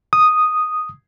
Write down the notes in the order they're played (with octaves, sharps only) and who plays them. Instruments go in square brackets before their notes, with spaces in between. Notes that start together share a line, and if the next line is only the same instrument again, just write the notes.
[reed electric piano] D#6